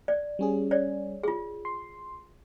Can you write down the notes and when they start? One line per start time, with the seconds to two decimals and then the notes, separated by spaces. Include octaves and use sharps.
0.08 D5
0.39 G3 C#4 G#4
0.71 C#5 D5
1.23 F4 G#4
1.65 C6